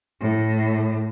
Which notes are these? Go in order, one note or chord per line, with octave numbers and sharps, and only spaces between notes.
A2